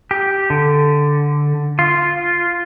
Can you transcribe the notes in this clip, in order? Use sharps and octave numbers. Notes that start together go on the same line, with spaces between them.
G4
D3
F4